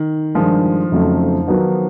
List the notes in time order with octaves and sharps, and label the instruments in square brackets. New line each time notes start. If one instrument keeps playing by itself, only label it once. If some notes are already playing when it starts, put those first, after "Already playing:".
Already playing: [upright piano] D#3
[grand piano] G2 D#3 G#3 [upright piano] F3
[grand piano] F2 C#3 F#3 A3 C4
D#3 F#3 B3 D#4 F#4